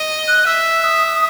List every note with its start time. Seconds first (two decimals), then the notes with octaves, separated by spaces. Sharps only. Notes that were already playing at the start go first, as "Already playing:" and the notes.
Already playing: D#5
0.28 F#6
0.46 E5 E6
0.84 D#6